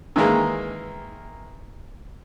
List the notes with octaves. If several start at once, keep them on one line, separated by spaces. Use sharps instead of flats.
D#3 E3 G#3 A#3